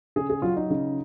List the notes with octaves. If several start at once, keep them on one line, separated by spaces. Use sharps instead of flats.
C#3 G#4
G#4
F#3 F4
D#4
C#3